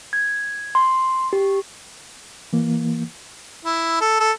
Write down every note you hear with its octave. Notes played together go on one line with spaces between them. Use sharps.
G#6
C6
G4
E3 A#3
E4
A4
A4